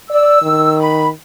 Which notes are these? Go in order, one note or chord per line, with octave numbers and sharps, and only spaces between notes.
D5 E6
D#3
B5